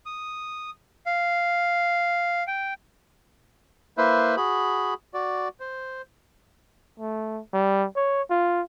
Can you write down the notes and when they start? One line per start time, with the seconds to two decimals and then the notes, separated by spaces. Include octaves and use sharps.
0.06 D#6
1.06 F5
2.47 G5
3.98 A#3 E4 B4 C5 E5
4.37 F#4 G#4 B5
5.14 F#4 D5
5.60 C5
7.00 A3
7.53 G3
7.96 C#5
8.30 F4